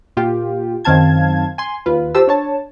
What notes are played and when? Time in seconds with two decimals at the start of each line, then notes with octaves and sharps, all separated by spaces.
0.17 A#2 F4 G4
0.85 F#2 D#3 C4 F5 A5 G#6
1.58 G#5 C6
1.86 D#2 F4 B4
2.15 F4 G4 C5 A5 E6
2.27 D4 C#5 A5